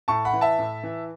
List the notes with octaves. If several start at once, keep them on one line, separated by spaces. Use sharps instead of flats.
A2 A5 C#6
F#5 B5
E3
E5 A5
A2
E3